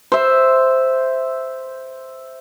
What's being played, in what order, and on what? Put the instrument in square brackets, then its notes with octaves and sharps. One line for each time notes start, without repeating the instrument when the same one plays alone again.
[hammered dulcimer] C5 E5